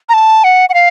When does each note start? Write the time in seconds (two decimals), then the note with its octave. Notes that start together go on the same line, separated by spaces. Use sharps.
0.09 A#5
0.14 A5
0.44 F#5
0.69 F#5
0.74 F5